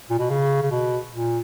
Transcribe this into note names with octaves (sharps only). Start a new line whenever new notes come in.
A#2
B2
C#3
C#3
B2
A#2